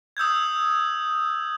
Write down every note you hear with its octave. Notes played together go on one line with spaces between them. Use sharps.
D#6 E6 G6 G#6